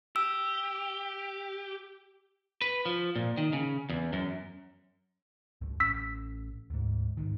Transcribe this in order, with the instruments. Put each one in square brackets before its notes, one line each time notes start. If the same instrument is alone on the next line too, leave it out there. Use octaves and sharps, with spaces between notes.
[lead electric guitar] G4 [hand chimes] E6
[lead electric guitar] B4
F3
A#2
D#3
C#3
E2
F#2
[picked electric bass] C#2 F#2
[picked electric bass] A1 C#4 [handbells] E6 B6
[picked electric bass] D2 G#2
C2 G#2 D#3